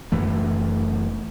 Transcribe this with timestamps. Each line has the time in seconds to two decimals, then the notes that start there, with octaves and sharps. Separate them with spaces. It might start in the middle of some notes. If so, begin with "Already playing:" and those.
0.12 F#1 F#2 E3 A3